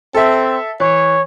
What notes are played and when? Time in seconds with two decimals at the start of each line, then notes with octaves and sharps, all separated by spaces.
0.15 C4 A4 E5
0.80 E3 C#5